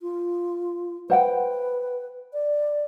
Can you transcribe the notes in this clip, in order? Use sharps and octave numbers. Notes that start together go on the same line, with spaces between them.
F4
B4 C5 F#5 G5
D5